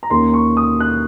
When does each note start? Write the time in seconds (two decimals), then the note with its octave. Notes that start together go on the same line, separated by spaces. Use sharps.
0.03 A#5
0.10 D#2 D#3 A#3 C#4 C6
0.34 C#6
0.57 D#6
0.80 F#6